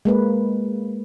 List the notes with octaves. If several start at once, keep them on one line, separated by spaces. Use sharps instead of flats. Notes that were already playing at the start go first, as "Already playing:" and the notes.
G#3 A#3 B4